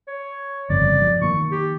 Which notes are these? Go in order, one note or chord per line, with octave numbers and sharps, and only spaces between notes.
C#5
G1 F2 C#3 D5
F3
D#3 A#3 C#6
G4